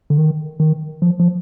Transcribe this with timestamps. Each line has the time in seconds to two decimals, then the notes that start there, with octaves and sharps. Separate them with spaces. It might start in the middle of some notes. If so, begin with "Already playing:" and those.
0.10 D3
0.18 D#3
0.60 D#3
1.02 F3
1.20 F3